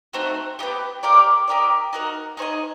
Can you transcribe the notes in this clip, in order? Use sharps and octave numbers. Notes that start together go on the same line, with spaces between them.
A3 C4 D#4 F#4
B3 D#4 G4
G4 A#4 D5 F5
D#4 G4 A#4 D5
D#4 F#4 A#4
D#4 G#4 C5 D#5